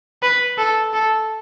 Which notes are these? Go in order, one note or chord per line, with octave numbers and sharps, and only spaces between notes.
B4
A4
A4